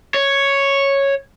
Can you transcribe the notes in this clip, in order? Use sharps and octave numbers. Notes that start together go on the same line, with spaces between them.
C#5